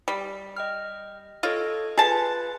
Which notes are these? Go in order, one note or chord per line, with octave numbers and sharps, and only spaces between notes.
G3
D#5 G5 F6
F4 A4 C#5 D#5
F4 G#4 B4 A5